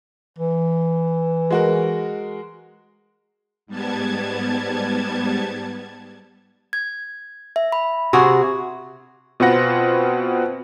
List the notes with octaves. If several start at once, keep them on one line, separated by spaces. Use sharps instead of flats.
E3
G#3 F#4 A#4
G#2 G3 B3 A5 G#6
G#6
E5
E5 B5
C3 F#4 G#4
B2 C4 F4 B4 F#5 A#6